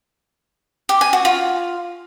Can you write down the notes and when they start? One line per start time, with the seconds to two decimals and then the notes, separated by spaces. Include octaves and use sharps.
0.89 G4
1.01 G#5
1.13 F#4
1.25 F4